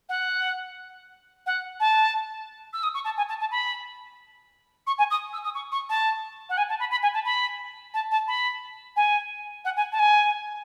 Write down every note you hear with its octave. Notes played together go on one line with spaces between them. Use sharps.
F#5
F#5
A5
E6
D#6
C#6
A5
G#5
A5
A5
B5
C#6
G#5
D#6
E6
D#6
C#6
C#6
A5
F#5
G#5
A5
B5
B5
G#5
A5
B5
A5
A5
B5
G#5
F#5
G#5
A5
G#5